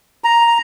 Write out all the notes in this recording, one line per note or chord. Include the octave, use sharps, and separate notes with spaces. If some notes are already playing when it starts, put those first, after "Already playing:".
A#5